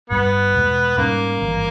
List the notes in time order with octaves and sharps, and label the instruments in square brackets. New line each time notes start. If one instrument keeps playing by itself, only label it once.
[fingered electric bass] G1 G2 G3 [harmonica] B3
[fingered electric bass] E2 B2 G#3
[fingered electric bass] G#2 G3 C#4 [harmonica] A#3
[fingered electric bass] G#1 G2 E3